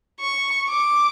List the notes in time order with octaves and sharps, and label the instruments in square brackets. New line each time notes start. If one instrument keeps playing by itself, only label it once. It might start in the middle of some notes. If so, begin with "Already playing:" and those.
[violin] C#6
D6